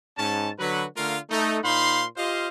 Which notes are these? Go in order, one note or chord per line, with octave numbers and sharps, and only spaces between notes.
G#2 C#4 A5
D3 F#3 F#4 B4
D3 A3 F4 A#4 F5
A3 D#4
A#2 D#4 C5 F5 B5 C6
F4 G4 C5 D#5 F5